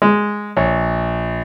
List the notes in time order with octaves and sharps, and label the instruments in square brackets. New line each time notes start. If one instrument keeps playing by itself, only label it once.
[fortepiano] G#3
[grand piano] A#1 [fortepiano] C#5